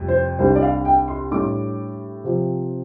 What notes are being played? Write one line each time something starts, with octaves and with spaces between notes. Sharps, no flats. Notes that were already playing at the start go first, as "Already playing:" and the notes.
Already playing: F2 C3 G3
C5
C2 C3 G3 D4 C5
D5
F5
G5
C6
A2 G3 D4 D6
C3 F3 C4